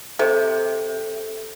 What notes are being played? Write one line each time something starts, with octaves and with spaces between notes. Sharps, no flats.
C3 A4